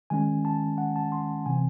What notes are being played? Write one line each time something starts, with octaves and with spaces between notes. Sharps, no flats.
D#3 G#3 C#4 G#5
A5
F#5
A5
C6
C3 E3 C4 G#5